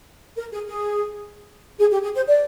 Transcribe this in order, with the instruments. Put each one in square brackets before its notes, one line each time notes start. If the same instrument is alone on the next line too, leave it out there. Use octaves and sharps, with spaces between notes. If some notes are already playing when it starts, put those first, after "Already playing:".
[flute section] A#4
G#4
G#4
G#4
G4
G#4
C5
D5